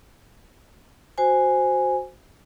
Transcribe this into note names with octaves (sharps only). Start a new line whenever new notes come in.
F#4 C5 G#5